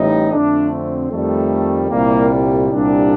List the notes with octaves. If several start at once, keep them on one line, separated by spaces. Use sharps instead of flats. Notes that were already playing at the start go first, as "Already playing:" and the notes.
Already playing: A1 A2 G3 D#4
F2 D3 A3 D4
C4
F2 D#3 G3 A3
C2 A#2 G3 A#3
C2 A#2 G3 D4